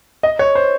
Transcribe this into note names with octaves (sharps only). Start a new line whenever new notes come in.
D#5
C#5
C5